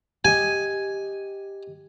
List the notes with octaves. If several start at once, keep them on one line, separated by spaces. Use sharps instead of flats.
G4 D#5 G#5